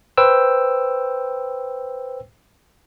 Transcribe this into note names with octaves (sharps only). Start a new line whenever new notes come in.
B4 C5 G5 E6